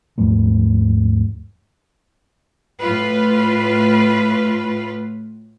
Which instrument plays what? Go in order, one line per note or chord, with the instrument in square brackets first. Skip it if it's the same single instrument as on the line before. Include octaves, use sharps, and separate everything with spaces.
[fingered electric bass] D#2 G#2 F3 A3
[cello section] A2 F4 B4